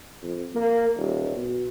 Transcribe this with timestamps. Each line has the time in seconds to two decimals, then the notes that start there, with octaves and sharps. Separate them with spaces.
0.23 F2
0.55 A#3
0.96 D#1
1.37 B2